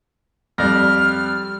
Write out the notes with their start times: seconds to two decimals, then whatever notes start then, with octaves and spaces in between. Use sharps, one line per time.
0.58 F2 G3 D5 F6 A#6